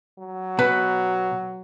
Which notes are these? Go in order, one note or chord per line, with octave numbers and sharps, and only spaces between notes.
F#3
B2 B4